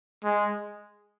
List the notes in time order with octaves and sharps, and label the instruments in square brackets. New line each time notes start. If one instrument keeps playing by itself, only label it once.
[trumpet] G#3